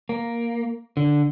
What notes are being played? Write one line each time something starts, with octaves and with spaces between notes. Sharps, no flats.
A#3
D3